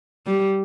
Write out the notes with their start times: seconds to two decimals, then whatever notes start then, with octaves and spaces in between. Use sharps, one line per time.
0.27 G3